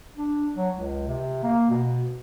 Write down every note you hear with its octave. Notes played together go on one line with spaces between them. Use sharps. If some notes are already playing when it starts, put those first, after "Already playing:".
D4
F#3
C#2
C3
A#3
B2